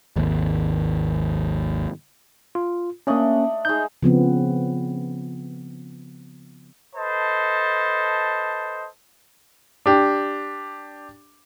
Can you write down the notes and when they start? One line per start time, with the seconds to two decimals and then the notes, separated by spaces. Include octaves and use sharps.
0.16 G#1 D#2
2.55 F4
3.07 A3 A#3 C#4 D4 D#5
3.65 G#3 D#4 G6
4.03 C#3 F3 B3 C4
6.96 A4 B4 C5 D#5 A5
9.86 D4 G4